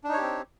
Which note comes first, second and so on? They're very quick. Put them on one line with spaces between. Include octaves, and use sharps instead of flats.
D4 D#4 C#5 G4 C4